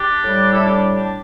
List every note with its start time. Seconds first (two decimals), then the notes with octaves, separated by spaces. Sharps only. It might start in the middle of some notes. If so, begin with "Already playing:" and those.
Already playing: D4 G4
0.22 A2 G3
0.51 E4 A4
0.65 D4 G4
0.95 D4 G4